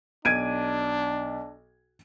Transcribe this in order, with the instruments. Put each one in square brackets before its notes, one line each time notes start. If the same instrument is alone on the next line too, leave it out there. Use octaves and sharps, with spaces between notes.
[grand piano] B1 [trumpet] D4 [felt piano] G#6 D7 D#7